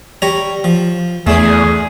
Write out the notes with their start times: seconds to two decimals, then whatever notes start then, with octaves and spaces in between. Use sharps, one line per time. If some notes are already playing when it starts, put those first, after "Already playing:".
0.22 G3 C#5 A#5
0.64 F3
1.27 E2 A3 D4 G#4